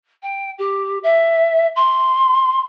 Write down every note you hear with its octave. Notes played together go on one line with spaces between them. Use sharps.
G5
G4
E5
C6